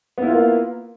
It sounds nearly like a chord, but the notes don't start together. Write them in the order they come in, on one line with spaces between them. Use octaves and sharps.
B3 E4 F4 A#3